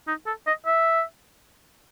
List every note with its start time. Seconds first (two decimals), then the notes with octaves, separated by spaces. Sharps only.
0.08 D#4
0.26 A4
0.47 D#5
0.66 E5